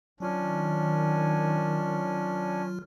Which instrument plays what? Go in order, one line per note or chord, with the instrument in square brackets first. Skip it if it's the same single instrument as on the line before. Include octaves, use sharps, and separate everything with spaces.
[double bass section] D#3 [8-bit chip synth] F#3 F4 F6 [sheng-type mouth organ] C#4 D4